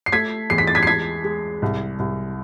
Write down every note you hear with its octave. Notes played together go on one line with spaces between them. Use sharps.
C7
A3 G#6 B6
E2 C7
B6
A6
G#6 B6
C7
G#3 G#6 B6
G#3
C2
C2